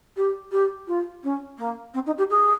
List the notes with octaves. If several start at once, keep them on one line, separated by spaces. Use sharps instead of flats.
G4
G4
F4
C#4
A#3
C4
D#4
G4
G#4